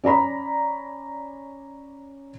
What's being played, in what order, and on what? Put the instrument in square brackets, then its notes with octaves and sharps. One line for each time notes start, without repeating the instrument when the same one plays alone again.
[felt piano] C#4 D5 A#5 B5